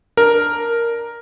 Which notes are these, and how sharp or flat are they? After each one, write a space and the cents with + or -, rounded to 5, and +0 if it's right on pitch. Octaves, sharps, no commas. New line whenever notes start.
D4 +15 A#4 +0